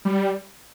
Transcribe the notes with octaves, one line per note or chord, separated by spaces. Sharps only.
G3